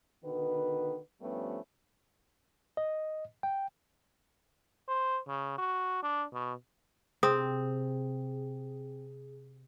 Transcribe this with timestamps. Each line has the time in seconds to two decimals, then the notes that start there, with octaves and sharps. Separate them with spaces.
0.24 B2 D3 D#3 B4
1.22 G2 F3 G3 A3 B3 C#4
2.77 D#5
3.43 G5
4.88 C5
5.28 C#3
5.58 F#4
6.03 D4
6.33 B2
7.23 C3 C4 G#4 D#6